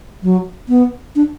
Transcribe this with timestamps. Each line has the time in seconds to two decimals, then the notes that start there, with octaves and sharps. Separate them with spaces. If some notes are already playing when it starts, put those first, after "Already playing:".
0.23 F#3
0.69 B3
1.16 D4